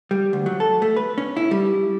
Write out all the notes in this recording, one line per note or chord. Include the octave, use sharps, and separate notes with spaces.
G3
D2
F#3
A4
A3
B4
C#4
E4
G3